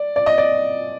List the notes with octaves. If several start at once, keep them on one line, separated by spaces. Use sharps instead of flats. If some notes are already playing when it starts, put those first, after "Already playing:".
Already playing: D5
D5
D#5
D5